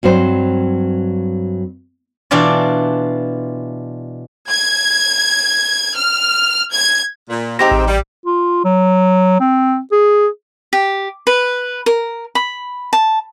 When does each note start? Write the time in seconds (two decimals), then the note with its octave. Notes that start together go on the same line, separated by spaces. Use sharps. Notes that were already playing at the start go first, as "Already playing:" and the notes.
0.03 G2 F#3 C4 C5
2.31 B2 E3 D4 F4 D5
4.50 G#6
5.95 F6
6.72 G#6
7.29 A#2
7.59 C3 G#3 C4 D#4 G4 C5 A#6
7.71 A1
7.87 G3
8.26 F4
8.65 F#3
9.40 C4
9.92 G#4
10.73 G4
11.27 B4
11.86 A#4
12.35 B5
12.93 A5